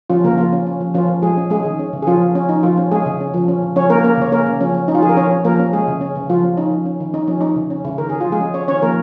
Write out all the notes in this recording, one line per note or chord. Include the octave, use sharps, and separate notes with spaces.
F3 C#4 F4
C#3 A#3 A#4
F3 A#3 F4
C#4
C#4
F3
F3 C#4 F4
F3
F3 G#3 G#4
C#4
G#3 C#4 G#4
D#3
C#4
C#3
G#4
F3 C#4 F4
F3
C#4
F3 D#4
F3 F4
C#4
G#3 C#4 G#4
C#3
C#4
F3
C#4
C#3
F3 C#4 C#5
A#3 C#4 A#4
A#3 C#4 A#4
C#3 C#5
A#3 C#4 A#4
C#3
F3 C#4
C#4
C#4 D#4
F4
F3 G#4
A#4
F3 C#4 C#5
C#4
F3 A#3 A#4
C#4
G#3 C#4 G#4
C#3
C#4
C#3
F3 F4
C#4
C#4 D#4
F3
C#4
D#3
C#4 D#4
F3 C#4
C#4 D#4
C#3
C#4
C#3
D#3 A#4
C#4 G#4
F4
F3
G#3 G#4
C#4
C#4 C#5
D#3 C#4 C#5
F3 A#3 A#4